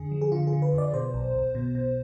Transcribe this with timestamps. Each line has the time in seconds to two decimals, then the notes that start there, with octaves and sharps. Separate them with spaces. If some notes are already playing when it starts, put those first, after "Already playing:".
Already playing: F2 D3 G#4
0.12 F3
0.21 G#4
0.32 D3 F4
0.47 G#4
0.53 D3
0.62 B4
0.73 F2
0.78 D5
0.94 B2 C5
1.14 B1
1.35 B1
1.55 B2
1.75 B2